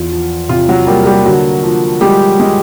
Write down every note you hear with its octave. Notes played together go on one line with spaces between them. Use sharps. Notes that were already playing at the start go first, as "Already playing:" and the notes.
Already playing: E2 F4
F3
C3 F4
F#3 F#4
G3 A#3 G4
G3 G4
D3 F#3 F#4
F3
G3 G#3 G4
G#3